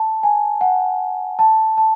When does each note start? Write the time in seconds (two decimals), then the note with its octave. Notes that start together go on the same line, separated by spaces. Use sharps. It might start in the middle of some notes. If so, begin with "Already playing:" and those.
Already playing: A5
0.23 G#5
0.61 F#5
1.39 A5
1.78 A5